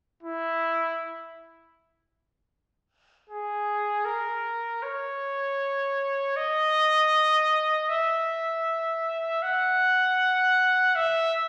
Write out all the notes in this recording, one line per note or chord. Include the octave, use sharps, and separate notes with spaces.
E4
G#4
A#4
C#5
D#5
E5
F#5
E5